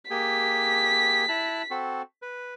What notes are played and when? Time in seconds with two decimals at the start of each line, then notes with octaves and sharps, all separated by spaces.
0.10 A#3 G4 G#4 B6
1.29 E4 A5 F#6
1.71 C4 F#4 A4
2.22 B4